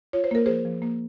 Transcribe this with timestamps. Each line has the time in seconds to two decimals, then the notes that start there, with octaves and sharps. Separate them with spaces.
0.13 F4 C#5
0.24 C5
0.31 A#3 A#4
0.46 F3 G#4 C5
0.65 F3
0.82 A#3